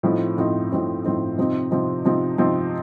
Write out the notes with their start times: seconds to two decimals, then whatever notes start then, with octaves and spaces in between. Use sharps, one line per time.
0.03 A2 F3 C4 D#4
0.38 A2 F3 C4 D#4
0.71 A2 F3 C4 D#4
1.04 A2 F3 C4 D#4
1.38 C3 F3 C4 D#4
1.71 C3 F3 C4 D#4
2.05 C3 F3 C4 D#4
2.38 C3 F3 C4 D#4